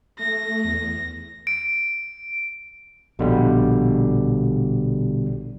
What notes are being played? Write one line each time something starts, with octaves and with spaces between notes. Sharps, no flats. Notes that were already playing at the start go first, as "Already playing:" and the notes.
A3 A#6
E2
D7
A#1 B2 D3 G3